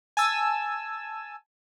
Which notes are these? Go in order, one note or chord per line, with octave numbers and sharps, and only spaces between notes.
G#5 A5 E6